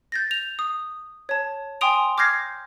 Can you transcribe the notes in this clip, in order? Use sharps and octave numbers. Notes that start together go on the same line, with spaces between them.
G6 A6 A#6
F7
D#6
C#5 A5
G5 G#5 C6 D#6 D7 F7
D6 F6 G6 G#6 A#6 C7